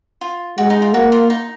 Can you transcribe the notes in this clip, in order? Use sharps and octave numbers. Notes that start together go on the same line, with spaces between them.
F4
G#3 F#4
D#4
F4
A#3 F#4
F4
D#4